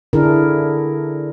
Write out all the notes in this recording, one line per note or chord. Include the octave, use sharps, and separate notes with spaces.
D3 D4 E4 G#4 A#4